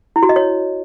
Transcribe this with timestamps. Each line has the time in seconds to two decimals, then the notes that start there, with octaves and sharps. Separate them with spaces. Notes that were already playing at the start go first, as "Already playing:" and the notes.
0.16 E4
0.23 F#4
0.29 D#5
0.36 C#5